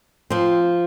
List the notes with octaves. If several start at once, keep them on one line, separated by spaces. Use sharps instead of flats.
F3 C4